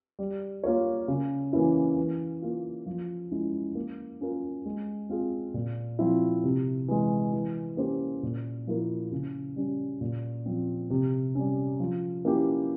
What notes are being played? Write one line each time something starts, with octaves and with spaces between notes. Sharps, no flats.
G3
A#3 F4 A#4 C#5
C#3
E3 A#3 C#4 E4
E3
A#3 F4
F3
G#3 C#4 E4
A#3
C#4 F4 A#4
G#3
C4 F4 G#4
A#2
F3 C4 E4
C3
E3 G#3
E3
A#3 C#4 G4 C5
A#2
F3 A#3 E4 A#4
C#3
G3 C#4
A#2
F3 C4
C3
G3 C#4
F3
A#3 C#4 E4 G4